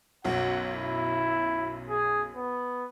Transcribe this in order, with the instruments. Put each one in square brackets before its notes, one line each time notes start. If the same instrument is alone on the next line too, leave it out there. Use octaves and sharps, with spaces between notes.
[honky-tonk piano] B1 F#2 [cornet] F#5
[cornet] E4
G#4
B3